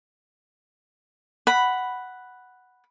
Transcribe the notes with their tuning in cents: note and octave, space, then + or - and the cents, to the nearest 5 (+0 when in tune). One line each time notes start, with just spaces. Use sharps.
F#5 +5 B5 +0